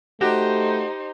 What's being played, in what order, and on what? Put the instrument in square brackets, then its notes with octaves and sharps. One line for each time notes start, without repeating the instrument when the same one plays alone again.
[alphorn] A3 [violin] D#4 C5 [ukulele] F#4 [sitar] G4